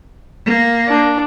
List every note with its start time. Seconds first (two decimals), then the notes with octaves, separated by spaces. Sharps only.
0.46 A#3
0.88 D4